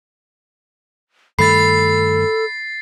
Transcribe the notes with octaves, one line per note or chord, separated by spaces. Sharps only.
G2 D#3 A3 A4 B5 A6 C7